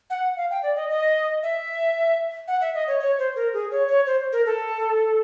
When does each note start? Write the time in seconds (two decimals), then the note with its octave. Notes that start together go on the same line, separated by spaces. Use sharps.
0.10 F#5
0.36 F5
0.51 G5
0.63 D5
0.76 D#5
0.90 D#5
1.43 E5
2.48 F#5
2.61 E5
2.75 D#5
2.88 C#5
3.00 C#5
3.19 C5
3.36 A#4
3.53 G#4
3.71 C#5
3.88 C#5
4.07 C5
4.33 A#4
4.46 A4